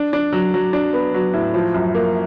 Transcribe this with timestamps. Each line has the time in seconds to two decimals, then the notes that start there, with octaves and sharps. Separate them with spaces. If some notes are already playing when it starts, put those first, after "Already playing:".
Already playing: D4
0.13 D4
0.32 F#3
0.54 F#3
0.73 D4
0.93 B3
1.14 F#3
1.33 A2
1.54 F3
1.74 F#2
1.95 A#3